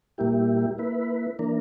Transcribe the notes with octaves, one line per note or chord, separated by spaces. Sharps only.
A#2 G3 A#3 E4 G4
A#3 E4 B4
E3 A#3 D4 A#4